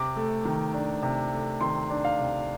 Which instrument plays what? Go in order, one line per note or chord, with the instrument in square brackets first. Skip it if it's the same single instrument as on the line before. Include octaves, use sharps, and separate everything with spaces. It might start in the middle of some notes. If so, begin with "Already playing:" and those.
Already playing: [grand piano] C3 D6
A3
D#3
D4
C3
A3
D#3 C6
D4
F5
C3